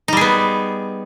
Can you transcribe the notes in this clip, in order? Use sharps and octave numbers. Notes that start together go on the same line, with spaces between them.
G3 B3 D#4 G#4